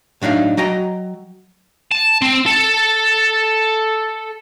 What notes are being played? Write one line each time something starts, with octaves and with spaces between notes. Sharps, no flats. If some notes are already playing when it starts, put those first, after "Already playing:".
A2 F#3 D4 D#4 F5
F#3 D#5 G5 A#5
A5
C4
A4